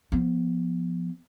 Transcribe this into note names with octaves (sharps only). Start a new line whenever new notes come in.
F3 B3